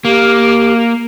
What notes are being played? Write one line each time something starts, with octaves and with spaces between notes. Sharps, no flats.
A#3 G4